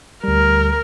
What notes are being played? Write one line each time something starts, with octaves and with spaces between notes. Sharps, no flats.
D2 G3 A#4